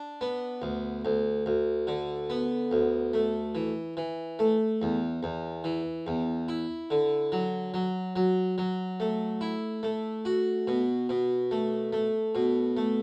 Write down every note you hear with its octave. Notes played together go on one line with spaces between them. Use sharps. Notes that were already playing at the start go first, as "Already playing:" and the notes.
Already playing: D4
B3
D2
D2
D2
D3
B3
D2
A3
E3
E3
A3
E2
E2
E3
E2
E4
D3
F#3
F#3
F#3
F#3
A3
E4
A3
F#4
B2
B2
A3
A3
B2
A3